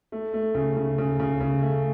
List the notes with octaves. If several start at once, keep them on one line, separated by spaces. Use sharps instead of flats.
A3
A3
C#3
C#3
C#3
C#3
C#3
A3